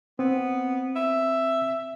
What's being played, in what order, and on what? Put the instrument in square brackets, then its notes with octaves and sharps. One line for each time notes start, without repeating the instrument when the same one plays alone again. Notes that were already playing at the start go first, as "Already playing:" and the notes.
[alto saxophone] B3 [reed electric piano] C4
[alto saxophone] E5